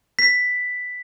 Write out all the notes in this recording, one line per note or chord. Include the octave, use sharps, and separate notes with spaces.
B6